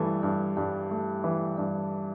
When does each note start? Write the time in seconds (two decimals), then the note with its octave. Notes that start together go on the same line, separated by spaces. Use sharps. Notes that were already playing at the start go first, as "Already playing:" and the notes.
Already playing: G2 E3 A3
0.23 G2
0.57 G2
0.91 A3
1.24 E3
1.58 G2